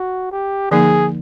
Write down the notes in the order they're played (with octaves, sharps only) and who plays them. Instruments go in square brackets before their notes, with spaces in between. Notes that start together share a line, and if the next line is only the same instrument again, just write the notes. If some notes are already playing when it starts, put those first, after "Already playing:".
Already playing: [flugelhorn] F#4
G4
[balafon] D3 F3 A#3 D#4 [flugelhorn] G#4